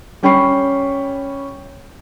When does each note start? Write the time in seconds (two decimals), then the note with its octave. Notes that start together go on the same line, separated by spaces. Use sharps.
0.23 G3 C#4 G5 B5 C#6 C7